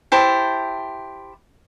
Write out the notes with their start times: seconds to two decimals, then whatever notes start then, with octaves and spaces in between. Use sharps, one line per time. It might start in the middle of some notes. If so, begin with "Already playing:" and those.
0.12 E4 G4 C5 A5